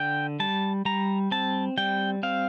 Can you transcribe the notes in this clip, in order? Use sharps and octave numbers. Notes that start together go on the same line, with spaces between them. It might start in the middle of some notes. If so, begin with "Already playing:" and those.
Already playing: D3 G5
G3 A5
G3 A#5
C4 A5
G3 G5
C4 F5